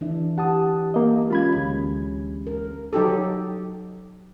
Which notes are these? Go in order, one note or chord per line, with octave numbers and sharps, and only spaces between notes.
E3 D4 E5
G4 F#5 A5 D#6
A#3 D#5
G#3 C#4 F4 B5 G#6
D2
A#4
F#3 D#4 G4 A4